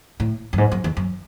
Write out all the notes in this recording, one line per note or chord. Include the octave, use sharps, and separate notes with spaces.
A2
F#2
G#2
F#2
E2
F#2